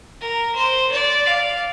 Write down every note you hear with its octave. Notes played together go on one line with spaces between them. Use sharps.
A#4
C5
D5
F5